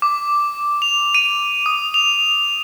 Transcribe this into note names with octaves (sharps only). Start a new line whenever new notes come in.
D6
F7
D#7
D#6
F7